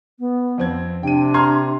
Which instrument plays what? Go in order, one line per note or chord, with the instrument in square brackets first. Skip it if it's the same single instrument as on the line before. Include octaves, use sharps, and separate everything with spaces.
[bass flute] B3
[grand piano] F2 C4 G#6
[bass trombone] C3 [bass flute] D4 [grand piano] G5 D#7
[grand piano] A#5 F6 G#6 [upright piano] C6